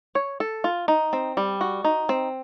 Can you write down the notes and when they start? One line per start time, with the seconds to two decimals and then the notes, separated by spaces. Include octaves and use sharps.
0.15 C#5
0.40 A4
0.64 F4
0.88 D#4
1.13 C4
1.37 G3
1.61 F#4
1.84 D#4
2.09 C4